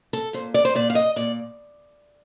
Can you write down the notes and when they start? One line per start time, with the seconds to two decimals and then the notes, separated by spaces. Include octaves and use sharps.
0.13 A4
0.33 A#2 C5
0.54 D5
0.65 C5
0.75 A#2 D5
0.90 F5
0.95 D#5
1.16 A#2 D5